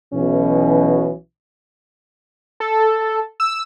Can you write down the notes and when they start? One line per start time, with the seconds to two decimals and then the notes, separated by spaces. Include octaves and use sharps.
0.14 B1 B2 E3 C#4
2.60 A4
3.40 E6